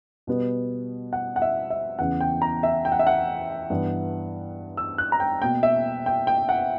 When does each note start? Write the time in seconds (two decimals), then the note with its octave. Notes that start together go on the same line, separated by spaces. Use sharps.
0.27 B2 G3 B3
1.13 F#5
1.36 F#5
1.42 E5
1.70 E5
1.99 E2 C#3 E3 F#5
2.21 G5
2.42 A#5
2.63 E5
2.85 G5
2.92 F#5
2.99 E5
3.07 F#5
3.70 G2 E3 B3
4.77 E6
4.98 F#6
5.12 A#5
5.20 G5
5.42 B2 A#3 G5
5.63 E5
6.06 G5
6.27 G5
6.49 F#5